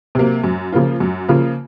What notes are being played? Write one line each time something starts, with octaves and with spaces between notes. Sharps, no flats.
C3 F#3 A#3
F#2
C#3 F3 A#3 F4
F#2
C#3 F3 A#3 F4